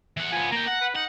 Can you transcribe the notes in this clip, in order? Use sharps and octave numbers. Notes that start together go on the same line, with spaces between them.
E3 F#5
F3 B3 G#5
A#3 G5 A#5
F#5
B4
D#4 F#5